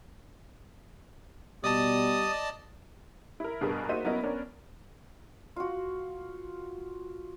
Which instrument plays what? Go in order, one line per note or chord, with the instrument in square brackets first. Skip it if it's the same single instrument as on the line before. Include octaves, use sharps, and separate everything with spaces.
[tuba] B2 [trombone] G3 [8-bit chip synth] D5 D#5 A5 [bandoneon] D#6
[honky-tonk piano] E4 A#4
G2 B2 G#4 A#4 B4
A#3 D#4 F#4 C5 E5 D#7
F#3 B3 C#4 E4 A#4 D#5
B3 C#4 D4 A#4
[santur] F4 F#4